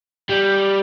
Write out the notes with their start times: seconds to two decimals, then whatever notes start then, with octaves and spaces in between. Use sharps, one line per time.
0.29 G3